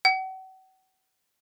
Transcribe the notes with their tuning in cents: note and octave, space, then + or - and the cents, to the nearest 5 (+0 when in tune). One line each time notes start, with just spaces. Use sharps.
F#5 +40